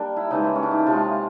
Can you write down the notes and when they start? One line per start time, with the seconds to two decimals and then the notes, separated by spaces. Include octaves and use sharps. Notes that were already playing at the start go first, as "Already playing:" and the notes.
Already playing: G3 A#3 D4
0.17 E4
0.31 C#3 E3 G#3 D#4
0.45 E4
0.55 C#4
0.63 D4
0.71 D#4
0.79 E4
0.87 C3 F3 G#3 F4